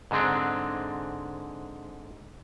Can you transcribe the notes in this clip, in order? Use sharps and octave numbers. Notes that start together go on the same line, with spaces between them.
G#2 D3 G#3 C4 D4